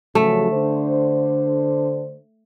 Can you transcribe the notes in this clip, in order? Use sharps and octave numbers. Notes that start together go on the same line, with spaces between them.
C#3 F3 F#3 A3
D3 D4 C5